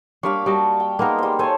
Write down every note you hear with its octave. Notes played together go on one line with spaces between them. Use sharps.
G3 A#3 D4 F5 B5 C#6
G3 F#4 D#5 A5
G5
G#3 A#3 B3 D#4 A#4
G3 C5
A4 C5 C#5 G#5 A5